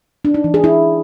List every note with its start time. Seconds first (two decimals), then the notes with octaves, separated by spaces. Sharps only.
0.25 D4
0.34 D#4
0.44 E3
0.54 G#4
0.64 E4